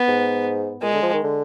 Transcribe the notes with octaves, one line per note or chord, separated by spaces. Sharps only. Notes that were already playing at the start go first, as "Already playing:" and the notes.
Already playing: B3
G#2
A#2 G#3
D3
F3
D#3
D3